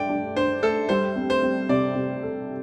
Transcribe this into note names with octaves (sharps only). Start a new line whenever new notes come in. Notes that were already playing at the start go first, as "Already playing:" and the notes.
Already playing: G2 A3 D5 G5
D4
D4 C5
A3 A4
G3 C5
C4
C5
C4
C3 D5
C3
A4